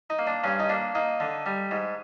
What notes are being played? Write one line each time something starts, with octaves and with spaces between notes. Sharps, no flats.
D#4
A#3
D4
G2 C#4
D#4
A#3 D4
A#3 D#4
D3
G3
G#2